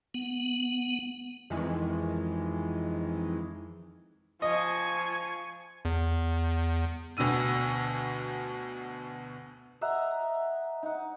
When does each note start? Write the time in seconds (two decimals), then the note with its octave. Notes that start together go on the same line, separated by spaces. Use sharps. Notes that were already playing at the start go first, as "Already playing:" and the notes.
0.14 B3
1.50 F2 D#3 E3 G#3
4.42 F3 D#5 G#5 C#6
5.85 E2
7.17 D2 B2 D3 E6 D#7
9.81 D#5 E5 F#5 A#5
10.83 D#4 F#5